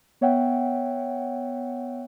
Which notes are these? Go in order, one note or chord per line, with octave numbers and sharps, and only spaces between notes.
B3 C#5 E5 F#5 G5